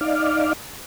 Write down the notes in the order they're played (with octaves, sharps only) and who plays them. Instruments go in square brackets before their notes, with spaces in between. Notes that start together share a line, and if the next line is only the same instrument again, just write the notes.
[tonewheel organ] D#4 D5 F5